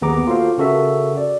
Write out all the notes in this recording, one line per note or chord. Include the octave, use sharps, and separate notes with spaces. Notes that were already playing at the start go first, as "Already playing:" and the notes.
A#1 D#2 B3 G#4 A#5 D6
F4 F#4 A4 C5 F5
C#3 F#4 A4 A#4 E5
D5